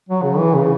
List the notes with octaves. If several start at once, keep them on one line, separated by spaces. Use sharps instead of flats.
F#3
C#3
E3
C#3